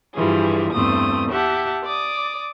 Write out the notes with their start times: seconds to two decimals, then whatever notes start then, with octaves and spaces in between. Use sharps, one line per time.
0.14 G2 E3 F3 G3 G#4
0.73 E2 G2 A3 C4 D#6
1.31 G4 E5 F#5 A5
1.83 D5 D6 D#6